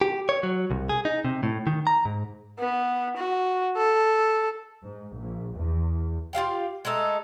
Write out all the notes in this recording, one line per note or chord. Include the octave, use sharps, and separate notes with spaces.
G4
C#5
F#3
C2
G#4
D#4
C3
A2
D#3
A#5
G#2
B3
F#4
A4
G#2
A#1
E2
F4 G4 F5 G5
G#3 A3 D#4 A4